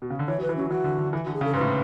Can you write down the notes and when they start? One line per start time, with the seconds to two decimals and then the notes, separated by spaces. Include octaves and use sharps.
0.02 B2
0.10 C#3
0.19 D3
0.28 E3 C#5
0.38 F#3
0.42 B4
0.49 E3
0.56 F#3 C#4
0.70 E3 F#4
0.84 D3
0.98 D3
1.13 E3
1.24 D3 F#4
1.34 G#4
1.41 C#3
1.44 A4
1.53 G#2 B4
1.61 A2